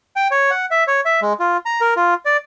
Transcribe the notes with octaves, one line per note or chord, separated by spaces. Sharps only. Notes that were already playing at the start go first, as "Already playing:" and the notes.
G5
C#5
F#5
E5
C#5
E5
G#3
F4
A#5
A#4
F4
D5